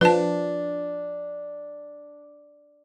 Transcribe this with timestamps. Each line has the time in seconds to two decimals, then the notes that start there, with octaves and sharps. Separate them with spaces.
0.01 F3 D4 B4 A5